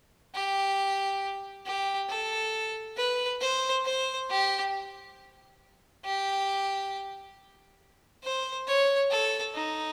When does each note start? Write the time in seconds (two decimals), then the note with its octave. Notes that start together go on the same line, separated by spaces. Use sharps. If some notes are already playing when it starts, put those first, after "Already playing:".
0.35 G4
1.66 G4
2.09 A4
2.97 B4
3.41 C5
3.85 C5
4.29 G4
6.05 G4
8.23 C5
8.67 C#5
9.11 A4
9.54 D#4